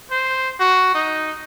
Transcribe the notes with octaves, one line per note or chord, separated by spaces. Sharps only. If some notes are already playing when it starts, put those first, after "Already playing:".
C5
F#4
D#4